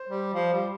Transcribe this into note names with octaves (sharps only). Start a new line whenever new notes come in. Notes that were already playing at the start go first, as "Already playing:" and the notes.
Already playing: C5
G3
F3
G3